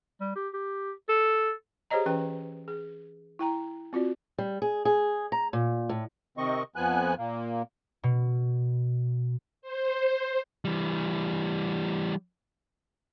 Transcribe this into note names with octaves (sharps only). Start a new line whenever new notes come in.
G3
G4
G4
A4
G4 G#4 C5 C#5 D#5 A#5
E3 C#4 B4 G5
G#4
E4 G5 A#5
C4 F4 F#4 D5
G3
G#4
G#4
A#5
A#2
A2
C3 D#3 C4 D#5 C#6
F2 F3 B3 G#5 F#6
A#2 A#3
B2
C5
E3 G3